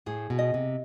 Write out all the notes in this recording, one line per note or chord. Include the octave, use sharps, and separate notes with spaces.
A2 G#4
B2
D#5
C3